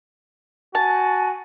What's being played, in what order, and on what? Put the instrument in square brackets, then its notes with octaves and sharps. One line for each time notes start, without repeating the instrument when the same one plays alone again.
[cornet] F#4 [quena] G#5 [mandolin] A5